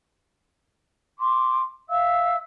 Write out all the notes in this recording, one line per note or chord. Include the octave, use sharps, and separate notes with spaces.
C6 D6
E5 F5 E6